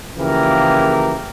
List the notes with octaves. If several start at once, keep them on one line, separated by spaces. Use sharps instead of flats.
C#3 E3 F3 A#3 G4 A#4